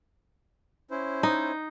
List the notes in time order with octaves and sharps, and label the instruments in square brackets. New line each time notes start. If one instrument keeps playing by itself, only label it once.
[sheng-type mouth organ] C#4 E4 C5
[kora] D#4